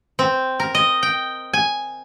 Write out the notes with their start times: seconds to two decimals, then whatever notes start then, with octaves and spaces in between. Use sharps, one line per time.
0.19 C4
0.60 A#4
0.75 D#5
1.03 G5
1.54 G#5